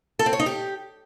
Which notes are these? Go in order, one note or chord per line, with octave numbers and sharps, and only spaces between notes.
A4
C4
C#5
D#4
G4